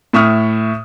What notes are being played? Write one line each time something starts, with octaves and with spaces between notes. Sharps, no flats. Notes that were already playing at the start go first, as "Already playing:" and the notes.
A2 E5 C#6 D#6 F6